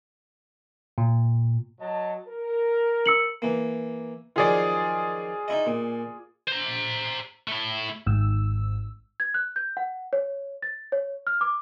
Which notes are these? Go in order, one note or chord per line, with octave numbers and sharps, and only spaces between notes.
A#2
F#3 D#5 A5
A#4
E6 C#7 F#7
E3 A#3
D#3 F3 F#3 F4 G#4 D5
D#4 E4 D#5
A#2
C5 A#5
A3 E4
G#1 G#2 E6
G#6
F#6
G6
F#5
C#5
A6
C#5
F6
D6